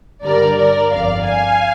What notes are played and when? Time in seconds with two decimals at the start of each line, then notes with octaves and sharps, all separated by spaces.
0.24 G2 D3 G3 A#4 D5
0.57 A#4 D5
0.91 G1 F2 D3 D5 F5
1.25 F5 G#5